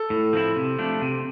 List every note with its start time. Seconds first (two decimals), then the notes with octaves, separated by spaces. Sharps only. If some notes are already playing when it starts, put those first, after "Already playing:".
Already playing: A4
0.10 A2
0.33 F3 C4 E4
0.55 C3
0.79 F3 A3 D4
1.02 C3